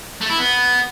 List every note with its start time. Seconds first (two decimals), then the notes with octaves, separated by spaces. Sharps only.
0.21 A3
0.30 E4
0.38 B3